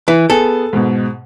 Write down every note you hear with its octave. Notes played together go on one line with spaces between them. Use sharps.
E3
B3 G#4 A4
G#2 B2